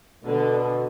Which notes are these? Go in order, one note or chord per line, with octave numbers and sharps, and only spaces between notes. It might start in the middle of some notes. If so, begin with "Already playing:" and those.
B2 D3